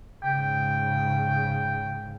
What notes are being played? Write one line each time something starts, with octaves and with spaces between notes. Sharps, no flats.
G#2 C#3 G5